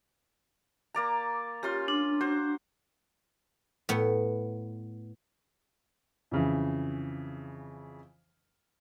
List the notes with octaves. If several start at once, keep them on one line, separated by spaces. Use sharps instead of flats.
A#3 D5 A#5
C#4 F4 G4 C6
D4
F#4 C5
A2 B3
F2 C#3 E3